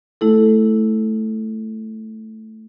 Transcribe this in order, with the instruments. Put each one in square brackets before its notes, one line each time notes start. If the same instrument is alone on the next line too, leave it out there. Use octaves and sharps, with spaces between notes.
[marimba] A3 E4 A4